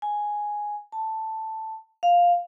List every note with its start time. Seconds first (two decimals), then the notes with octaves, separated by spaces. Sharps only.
0.02 G#5
0.92 A5
2.03 F5